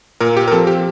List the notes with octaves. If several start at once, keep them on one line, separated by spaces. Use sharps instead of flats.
A#2 A#4
G4
A#4
F3 C4 A4
G4